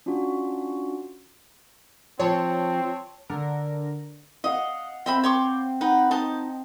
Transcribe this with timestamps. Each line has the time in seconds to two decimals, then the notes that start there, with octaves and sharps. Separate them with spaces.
0.06 C#4 D4 F4 F#4
2.20 F3 C4 C#5 A5
3.30 D3 A#4
4.44 D#5 F5 F#5
5.06 C4 D#5 E5 B5
5.24 C#5 C6 D6
5.81 D#4 B4 F#5
6.11 D#4 D#5 A5